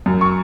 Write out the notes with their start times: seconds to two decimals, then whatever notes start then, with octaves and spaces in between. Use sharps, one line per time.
0.06 F#2
0.21 C#6